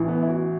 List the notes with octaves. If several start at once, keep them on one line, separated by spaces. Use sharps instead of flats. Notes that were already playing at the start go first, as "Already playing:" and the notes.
Already playing: A1 A2 E3
B3
E4
F#4